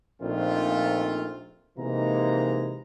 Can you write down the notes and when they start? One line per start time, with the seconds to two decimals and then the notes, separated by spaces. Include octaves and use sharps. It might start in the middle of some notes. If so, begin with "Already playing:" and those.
0.22 A#1 A#2 A3 C4 D#4 F4
1.78 C3 E3 G#3 A#3 D#4 A#5